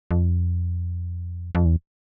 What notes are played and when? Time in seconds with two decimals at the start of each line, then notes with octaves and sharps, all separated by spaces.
0.11 F2
1.55 F2
1.65 E2